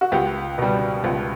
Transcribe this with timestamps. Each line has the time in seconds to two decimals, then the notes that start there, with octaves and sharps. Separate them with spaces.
0.01 F#4
0.12 C#2 G4
0.58 B2 G3
1.04 C#2